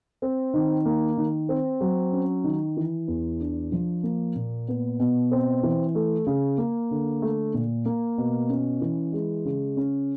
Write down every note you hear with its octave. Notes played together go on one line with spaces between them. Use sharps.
C4
D#3
A#3
D#3
C4
F#3
C#4
D#3
E3
E2
D4
F3
A#3
A#2
B3
B2
C4
E3
A3
C#3
A#3
D3
A3
A#2
A#3
B2
C#4
E3
G#3
C#3
C#4